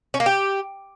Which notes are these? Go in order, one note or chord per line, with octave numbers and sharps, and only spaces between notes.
C#4
A#3
G4